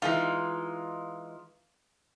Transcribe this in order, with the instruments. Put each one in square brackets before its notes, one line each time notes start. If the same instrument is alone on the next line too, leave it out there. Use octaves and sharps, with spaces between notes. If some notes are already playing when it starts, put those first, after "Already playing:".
[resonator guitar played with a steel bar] E3 G#3 D#4 [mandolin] F4